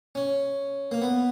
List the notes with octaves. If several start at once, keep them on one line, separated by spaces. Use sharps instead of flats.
C#4
A#3
B3